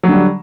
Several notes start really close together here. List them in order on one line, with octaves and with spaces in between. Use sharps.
F#3 D3 G3